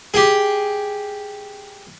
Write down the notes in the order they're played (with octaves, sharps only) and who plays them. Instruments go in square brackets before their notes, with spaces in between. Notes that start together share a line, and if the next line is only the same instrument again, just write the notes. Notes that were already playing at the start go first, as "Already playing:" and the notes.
[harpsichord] G4 G#4